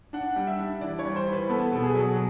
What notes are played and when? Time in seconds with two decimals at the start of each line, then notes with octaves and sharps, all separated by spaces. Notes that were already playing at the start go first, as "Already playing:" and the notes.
0.13 D4 F#5
0.36 G3
0.47 E5
0.59 D4
0.81 E3 D5
0.99 C#5
1.05 G3
1.16 C5
1.28 E3 B4
1.49 B3 A4
1.72 B2 A4
1.84 G#4
1.95 F#3